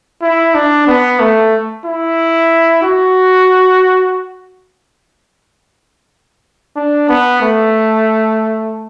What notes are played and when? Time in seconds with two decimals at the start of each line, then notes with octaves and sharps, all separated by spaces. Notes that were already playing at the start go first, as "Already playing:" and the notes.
0.22 E4
0.54 D4
0.87 B3
1.20 A3
1.86 E4
2.83 F#4
6.76 D4
7.09 B3
7.42 A3